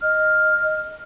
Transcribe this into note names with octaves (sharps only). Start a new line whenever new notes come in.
D#5 F6